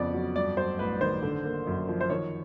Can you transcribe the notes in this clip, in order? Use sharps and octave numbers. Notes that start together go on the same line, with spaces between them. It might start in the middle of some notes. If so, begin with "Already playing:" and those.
Already playing: F2 C#3 B3 D5
F#3
G2 D5
F#3 C5
A1 B4
D#3 C5
D3
A#3
F#2
F3
C5
D#3 C#5